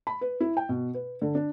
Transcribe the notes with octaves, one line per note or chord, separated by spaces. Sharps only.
B5
B4
E4
G5
B2
B4
D3
D4